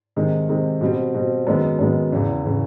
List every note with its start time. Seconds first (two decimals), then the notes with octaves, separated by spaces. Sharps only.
0.16 C3 D#3 G#3
0.49 C3 D#3 G#3
0.81 B2 G3 C4
1.14 B2 G3 C4
1.47 F#2 D#3 G#3 B3
1.79 F#2 D#3 G#3 B3
2.12 E2 C#3 E3
2.45 C#3 E3